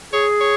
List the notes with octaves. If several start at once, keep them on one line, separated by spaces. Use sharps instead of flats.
G#4 C#5
C#5